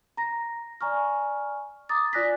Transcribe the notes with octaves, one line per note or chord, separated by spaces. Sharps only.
A#5 A#6
D5 G#5 A#5 C#6 F6
A#5 D6 D#6 A6
F4 D5 G#5 F#6 A#6 B6